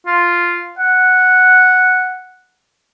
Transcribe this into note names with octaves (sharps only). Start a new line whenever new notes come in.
F4
F#5